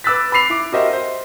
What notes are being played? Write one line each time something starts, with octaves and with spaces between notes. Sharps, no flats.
B4 D6 E6 F#6 A6 B6
B5 D6 B6 C7 F7
E4 D6
F#4 G4 A#4 C5 D#5 E5
C5